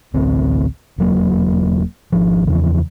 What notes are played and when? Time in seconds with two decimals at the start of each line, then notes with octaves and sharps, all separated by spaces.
0.14 A1 D2 C4
0.98 E1 F#3 A#3
2.12 G#1 F3
2.47 E2 C#3 E3 F3